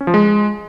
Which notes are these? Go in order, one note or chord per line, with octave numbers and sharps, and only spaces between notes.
C#4
F3
G#3